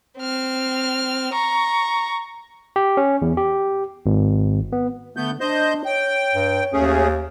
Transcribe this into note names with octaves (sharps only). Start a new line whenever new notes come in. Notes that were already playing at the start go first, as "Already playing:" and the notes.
C4 F6
A#5 C#6
G4
C#4
E2
G4
G#1
B3
D3 A3 B3 G6
D4 C5 D#5 G6
C#5 G5
G2
D#2 A3 C#4 G#4